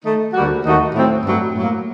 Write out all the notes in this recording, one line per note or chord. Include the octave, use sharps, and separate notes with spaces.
D#3 A3 D#4
D2 D3 G3 A#3 F#4
D#2 D#3 A3 D#4 F#4
A2 F#3 C4
G2 F#3 A3
A2 F#3 A#3